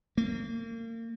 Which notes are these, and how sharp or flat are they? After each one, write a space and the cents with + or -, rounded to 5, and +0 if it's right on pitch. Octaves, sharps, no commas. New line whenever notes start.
A#3 -35